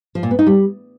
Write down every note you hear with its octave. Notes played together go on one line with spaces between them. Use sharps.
F3
A#2
B3
D#4
G3